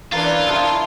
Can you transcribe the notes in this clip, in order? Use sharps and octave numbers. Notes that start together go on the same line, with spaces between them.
E3 C#4 D4 F4 A#4
C3 F#3 C#4 C5 A5 E6
E4